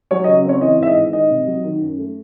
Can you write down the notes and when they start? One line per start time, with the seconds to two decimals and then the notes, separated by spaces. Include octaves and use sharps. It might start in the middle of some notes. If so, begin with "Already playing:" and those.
0.11 F#3 C#5
0.24 D#5
0.28 C#3
0.45 C4 C#5
0.61 E3 D#5
0.79 G#2 E5
0.87 D#5
0.96 G#1
1.13 D#3 D#5
1.30 C3
1.47 F#3
1.64 D#3
1.81 F#2
1.98 A3